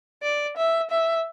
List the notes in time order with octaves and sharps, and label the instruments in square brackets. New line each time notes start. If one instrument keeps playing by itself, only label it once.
[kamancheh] D5
E5
E5